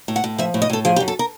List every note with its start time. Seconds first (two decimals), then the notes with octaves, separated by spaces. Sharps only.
0.08 A2
0.16 F#5
0.24 A2
0.38 F3 E5
0.54 A2
0.62 D#5
0.70 A2 A4
0.85 F3 G#4
0.96 G4
1.00 F#2
1.08 A4
1.19 A#4